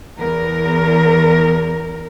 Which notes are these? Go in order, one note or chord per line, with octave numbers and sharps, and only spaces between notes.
E2 A#4